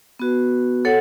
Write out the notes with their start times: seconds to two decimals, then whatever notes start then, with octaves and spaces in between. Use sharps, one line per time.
0.19 B3 F#4 B4
0.85 A4 C#5 F#5